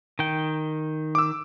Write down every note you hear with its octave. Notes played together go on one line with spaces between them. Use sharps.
D#3 G5
D6 E6